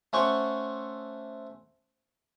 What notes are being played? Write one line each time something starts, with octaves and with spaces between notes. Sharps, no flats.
A3 C#4 C5 F#5 C#6 D6